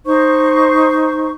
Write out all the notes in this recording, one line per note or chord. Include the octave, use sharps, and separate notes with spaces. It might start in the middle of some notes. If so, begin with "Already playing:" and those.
D#4 C5 C#6